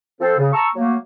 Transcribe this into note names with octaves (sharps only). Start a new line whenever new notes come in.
F3 C4 A4 C5
C#3
A5 A#5 C#6 E6
F#3 A3 A#3